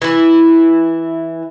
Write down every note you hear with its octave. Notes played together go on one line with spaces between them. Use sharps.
E3 E4